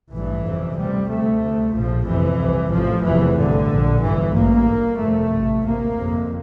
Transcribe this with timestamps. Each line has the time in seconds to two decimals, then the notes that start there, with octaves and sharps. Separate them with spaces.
0.11 A1 G2 E3
0.44 G1 F2 C3
0.76 D2 C3 G3
1.08 D2 C3 A3
1.41 D2 C3
1.74 A#1 A2 F3
2.06 G1 F2 C3 E3
2.39 C2 C3
2.71 A1 A2 F3
3.04 F1 E2 C3 E3
3.37 A1 G2 D3
3.69 A#1 A#2
4.02 G1 G2 E3
4.34 A1 G2 A#3
4.67 G1 G2
4.99 G1 F2 C3 A3
5.32 A1 G2
5.65 D2 C3 A#3
5.97 G1 F2 C3